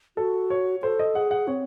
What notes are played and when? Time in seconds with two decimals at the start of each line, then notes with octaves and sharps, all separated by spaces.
0.17 F#4 A4
0.50 C#5
0.83 A4 C5
0.99 D#5
1.15 G#4 F#5
1.31 F#5
1.48 C4 C#5